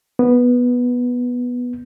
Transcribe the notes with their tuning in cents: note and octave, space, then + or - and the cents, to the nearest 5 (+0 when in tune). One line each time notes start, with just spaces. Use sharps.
B3 -10